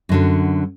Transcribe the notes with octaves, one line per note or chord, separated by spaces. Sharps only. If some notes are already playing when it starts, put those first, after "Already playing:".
F#2 D3 F#3